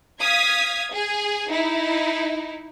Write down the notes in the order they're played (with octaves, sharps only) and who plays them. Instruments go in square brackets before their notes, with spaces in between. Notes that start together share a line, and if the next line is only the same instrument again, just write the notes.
[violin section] F5 D#6 G#6 B6
G#4
D#4 E4